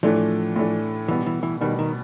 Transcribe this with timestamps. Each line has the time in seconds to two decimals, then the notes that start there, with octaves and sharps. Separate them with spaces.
0.03 A2 E3 F3 A3 D4
0.56 A2 E3 A3 D4
1.09 B2 E3 G3 B3
1.26 E3
1.43 E3
1.61 B2 D#3 G3 B3
1.79 D#3